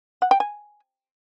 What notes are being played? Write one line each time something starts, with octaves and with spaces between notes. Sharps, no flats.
F#5
G5
G#5